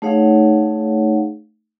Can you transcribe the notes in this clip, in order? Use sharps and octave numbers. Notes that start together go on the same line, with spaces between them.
A3 D#4 G#4 C#5 F5 F#5